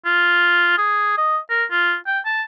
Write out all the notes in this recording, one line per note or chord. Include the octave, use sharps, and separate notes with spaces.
F4
G#4
D#5
A#4
F4
G5
A5